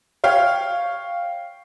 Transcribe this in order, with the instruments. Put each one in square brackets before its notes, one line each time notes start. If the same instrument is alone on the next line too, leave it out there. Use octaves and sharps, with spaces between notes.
[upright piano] C#5 F5 G5